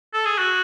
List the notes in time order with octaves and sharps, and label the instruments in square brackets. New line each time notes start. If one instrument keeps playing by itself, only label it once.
[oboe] A4
G#4
F#4